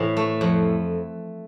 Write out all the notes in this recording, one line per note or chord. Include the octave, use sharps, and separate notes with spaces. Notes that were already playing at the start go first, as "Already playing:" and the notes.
Already playing: A2 E3 C4
A3
F2